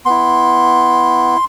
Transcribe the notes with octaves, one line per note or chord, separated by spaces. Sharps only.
B3 E4 C6